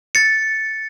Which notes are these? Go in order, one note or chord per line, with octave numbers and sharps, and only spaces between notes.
A6 C#7